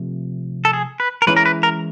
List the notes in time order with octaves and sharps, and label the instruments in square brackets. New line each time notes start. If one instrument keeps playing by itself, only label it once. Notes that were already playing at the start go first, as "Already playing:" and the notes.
Already playing: [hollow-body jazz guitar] C3 F3 A3
[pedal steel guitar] A4
G#4
B4
A#4
[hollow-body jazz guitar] E3 G#3 C#4 E4 [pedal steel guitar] B4
[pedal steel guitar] A#4
B4
A#4